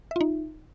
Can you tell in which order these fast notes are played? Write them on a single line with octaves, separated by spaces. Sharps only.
E5 F4 D#4